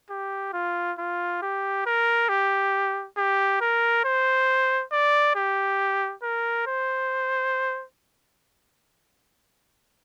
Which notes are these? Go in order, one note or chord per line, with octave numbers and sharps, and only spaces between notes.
G4
F4
F4
G4
A#4
G4
G4
A#4
C5
D5
G4
A#4
C5